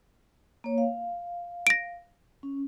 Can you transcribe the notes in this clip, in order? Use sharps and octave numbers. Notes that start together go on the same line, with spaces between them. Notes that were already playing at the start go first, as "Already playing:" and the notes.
A#3 C#5
F5
A#6 D7
C#4